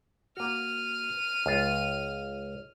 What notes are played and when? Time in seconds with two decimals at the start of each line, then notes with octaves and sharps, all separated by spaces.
0.37 A#3 F#4 F6 D#7
1.46 C#2 F4